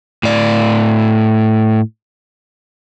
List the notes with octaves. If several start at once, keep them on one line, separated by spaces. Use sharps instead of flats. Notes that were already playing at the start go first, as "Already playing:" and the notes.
A2 D5